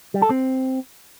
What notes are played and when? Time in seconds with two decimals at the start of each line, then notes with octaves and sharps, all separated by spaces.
0.14 G3
0.22 A4
0.30 C4